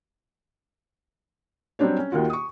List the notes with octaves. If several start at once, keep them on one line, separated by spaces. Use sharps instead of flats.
F#3 G3 C4 D4 G4 C#5
C#4
D#2 D#3 F4 F#4
C#6 D#6